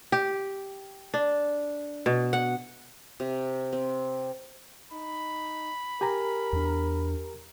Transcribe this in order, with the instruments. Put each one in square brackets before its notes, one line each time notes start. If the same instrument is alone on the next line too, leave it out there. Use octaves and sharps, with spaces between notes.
[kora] G4
D4
B2
F#5
[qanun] C3
C4
[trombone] D#4 [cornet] B5
[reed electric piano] G4 G#5 A#5 [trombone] A#4
[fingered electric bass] E2 D4